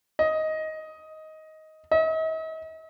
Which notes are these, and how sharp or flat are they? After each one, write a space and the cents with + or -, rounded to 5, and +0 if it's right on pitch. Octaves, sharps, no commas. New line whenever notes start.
D#5 +10
D#5 +45